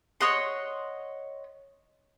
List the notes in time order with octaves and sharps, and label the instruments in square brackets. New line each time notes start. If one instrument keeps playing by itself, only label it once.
[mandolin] C#5 D#5 F#5 C6